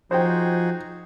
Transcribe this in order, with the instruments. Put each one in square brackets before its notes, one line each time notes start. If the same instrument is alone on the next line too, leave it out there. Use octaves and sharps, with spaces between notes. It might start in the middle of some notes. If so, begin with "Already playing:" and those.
[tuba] F3 [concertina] D#4 F#4 G#4 [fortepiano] C5 G5